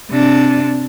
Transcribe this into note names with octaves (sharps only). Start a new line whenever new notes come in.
C3 D4